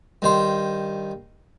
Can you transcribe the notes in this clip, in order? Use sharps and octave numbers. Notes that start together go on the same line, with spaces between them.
G2 D#3 C5